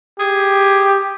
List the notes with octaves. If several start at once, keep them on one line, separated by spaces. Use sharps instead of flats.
G4 G#4